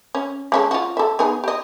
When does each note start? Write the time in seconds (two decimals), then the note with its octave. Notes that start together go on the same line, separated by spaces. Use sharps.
0.15 C#4
0.52 G#3 C#4 A4
0.71 F4 F#4
0.97 A4 E5
1.19 B3 D#4 G#4
1.44 G4 D#5